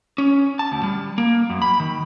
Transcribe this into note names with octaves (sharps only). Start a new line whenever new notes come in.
C#4
A5
D2
G3
A#3
F#2
B5
D#3